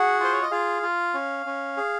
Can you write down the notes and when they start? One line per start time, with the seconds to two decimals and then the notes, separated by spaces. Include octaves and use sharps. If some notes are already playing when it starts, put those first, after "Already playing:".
Already playing: F#4 G#4 F#5
0.20 F4 C5
0.33 C#5
0.42 D#5
0.51 F4 G#4 F5
0.83 F4
1.14 C#4
1.46 C#4
1.77 G#4